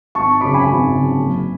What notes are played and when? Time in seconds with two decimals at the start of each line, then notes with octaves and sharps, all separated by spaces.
0.15 G#1 A5 C#6
0.41 F#2 C#3 B5 D6
0.54 G#5 B5
0.66 G#1
0.92 F#2 C#3
1.18 F#1